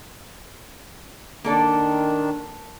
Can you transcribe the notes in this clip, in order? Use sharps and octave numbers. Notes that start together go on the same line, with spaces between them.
D#3 A#3 D4 A4 D5